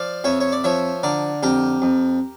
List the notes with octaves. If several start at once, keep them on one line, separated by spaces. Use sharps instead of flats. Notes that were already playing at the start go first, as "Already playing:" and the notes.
Already playing: F3 D5 F5
F2 C#5 E5
C#5
D5
F3 C#5 E5
D3 A#4 D5
F2 G4 A#4
F2